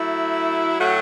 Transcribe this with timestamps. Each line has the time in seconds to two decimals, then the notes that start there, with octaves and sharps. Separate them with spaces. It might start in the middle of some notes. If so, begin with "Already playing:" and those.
Already playing: F#3 A3 E4
0.79 A2 F#3 A3 F#4